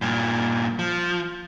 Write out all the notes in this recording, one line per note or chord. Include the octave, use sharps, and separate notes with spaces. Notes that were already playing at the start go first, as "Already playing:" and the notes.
G2 A#2
F3